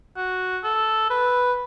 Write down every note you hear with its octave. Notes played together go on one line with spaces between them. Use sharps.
F#4
A4
B4